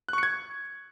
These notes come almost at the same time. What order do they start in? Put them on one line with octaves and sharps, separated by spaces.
F#6 C#6 C#7 G#6